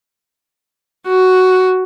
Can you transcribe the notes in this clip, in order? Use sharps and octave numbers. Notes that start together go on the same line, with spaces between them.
F#4